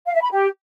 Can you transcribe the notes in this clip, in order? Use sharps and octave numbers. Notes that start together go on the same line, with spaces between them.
F5
E5
B5
G4